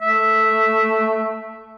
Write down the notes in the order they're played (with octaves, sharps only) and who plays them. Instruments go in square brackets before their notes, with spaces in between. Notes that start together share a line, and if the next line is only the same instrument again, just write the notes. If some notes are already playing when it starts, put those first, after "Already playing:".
[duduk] A3 [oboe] E5